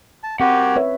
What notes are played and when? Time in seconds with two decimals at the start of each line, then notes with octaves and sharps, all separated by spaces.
0.23 A5
0.40 C4 F#4 G4 A#4 F#5
0.76 B4 C#5 E5